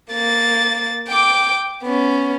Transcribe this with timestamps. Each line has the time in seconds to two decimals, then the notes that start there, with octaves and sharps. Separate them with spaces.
0.12 A#3 A6
1.08 G5 D6
1.83 B3 C#4